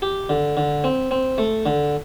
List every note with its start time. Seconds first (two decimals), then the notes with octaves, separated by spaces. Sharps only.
0.02 G4
0.29 D3
0.57 D3
0.84 C4
1.11 C4
1.38 A3
1.66 D3